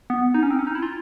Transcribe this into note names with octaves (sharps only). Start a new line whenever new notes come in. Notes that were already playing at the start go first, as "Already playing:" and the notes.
B3
D#4
C#4
C4
C#4
D#4
E4
F4